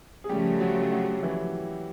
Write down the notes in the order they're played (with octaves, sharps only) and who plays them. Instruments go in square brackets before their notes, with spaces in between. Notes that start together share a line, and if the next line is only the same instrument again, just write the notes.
[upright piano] G#4
[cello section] C#3 F3 A3 [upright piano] G3 G4
[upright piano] F#3 F#4
F#3 F#4
E3 E4